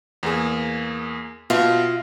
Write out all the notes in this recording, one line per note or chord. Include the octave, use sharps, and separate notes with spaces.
E2 A#3 G#4
B2 F4 E5 F5